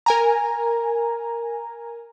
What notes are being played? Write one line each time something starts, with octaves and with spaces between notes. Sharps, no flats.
A#4 G#5 A#5